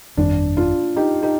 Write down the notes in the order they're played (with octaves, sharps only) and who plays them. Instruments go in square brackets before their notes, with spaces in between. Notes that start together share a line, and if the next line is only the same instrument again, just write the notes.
[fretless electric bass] G1 F2 D#3 G3 [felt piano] D4
[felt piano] D4 F4
D#4 G4
D#4 G4